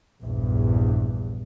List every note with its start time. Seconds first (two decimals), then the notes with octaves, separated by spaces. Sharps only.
0.22 A#1 E2 G2